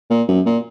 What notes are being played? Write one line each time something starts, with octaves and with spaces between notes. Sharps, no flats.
A#2
F#2
A#2